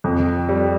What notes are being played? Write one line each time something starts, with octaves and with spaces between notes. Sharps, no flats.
F2
G3